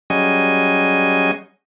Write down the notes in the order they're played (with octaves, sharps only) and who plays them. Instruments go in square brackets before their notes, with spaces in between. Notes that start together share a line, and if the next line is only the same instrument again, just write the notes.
[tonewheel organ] F#3 G3 C#4 G#4 D#5